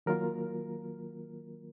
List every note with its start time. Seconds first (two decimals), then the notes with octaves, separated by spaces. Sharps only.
0.06 D#3 F#3 A#3 F4 A#4